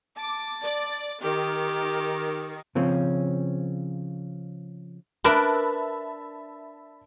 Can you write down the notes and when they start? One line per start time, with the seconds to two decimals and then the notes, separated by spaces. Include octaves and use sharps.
0.17 A5 D6
0.61 D5 A6
1.21 D#3 G4
2.75 C#3 F3 C4 C#4
5.24 D4 A#4 B4 E5 A5 B5